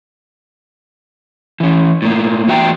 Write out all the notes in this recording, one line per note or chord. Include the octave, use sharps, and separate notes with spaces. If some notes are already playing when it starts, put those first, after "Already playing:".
E3 C#4
A2 A#3
E2 F#4 E5 G5 A#5